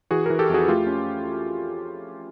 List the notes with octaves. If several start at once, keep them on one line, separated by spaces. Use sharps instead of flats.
E3 F#4 G#4
E3 G#4 A#4
G4 A4
F2 F#4 G#4
A3 F4 G4
C#4